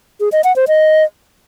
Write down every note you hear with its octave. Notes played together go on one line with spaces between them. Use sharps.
G#4
D#5
F#5
C5
D#5